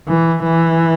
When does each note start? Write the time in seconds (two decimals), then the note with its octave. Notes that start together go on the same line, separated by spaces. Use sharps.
0.08 E3
0.43 E3